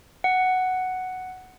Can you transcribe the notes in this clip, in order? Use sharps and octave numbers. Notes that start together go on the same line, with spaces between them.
F#5